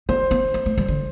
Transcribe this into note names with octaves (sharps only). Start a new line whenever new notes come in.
B3 C5
B3
G3
A3
G3
D3